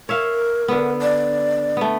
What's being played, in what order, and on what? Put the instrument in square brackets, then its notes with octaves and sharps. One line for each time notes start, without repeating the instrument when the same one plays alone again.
[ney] A#4 [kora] C#5 E5 F5
[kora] D3 B3
[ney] D5
[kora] A3 B3